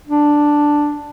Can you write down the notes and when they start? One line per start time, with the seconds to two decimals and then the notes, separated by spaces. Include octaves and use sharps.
0.07 D4